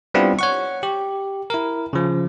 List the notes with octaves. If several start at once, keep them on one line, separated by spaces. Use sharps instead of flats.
G3 B3 C4 D4 E4 F4
C#5 F#5 C#6
G4
E4 A#4
C#3 F3